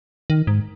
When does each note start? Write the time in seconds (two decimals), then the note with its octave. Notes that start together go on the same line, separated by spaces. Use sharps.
0.30 D#3
0.47 G#2